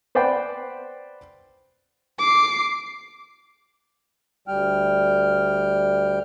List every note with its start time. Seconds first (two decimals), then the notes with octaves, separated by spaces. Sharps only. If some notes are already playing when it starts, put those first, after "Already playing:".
0.15 B4 C5 D5 F#5 G5 B5
2.19 D6 C7
4.48 D2 G3 G5 F6